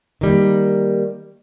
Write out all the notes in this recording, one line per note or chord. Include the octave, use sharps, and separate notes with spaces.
D#3 G3 A#3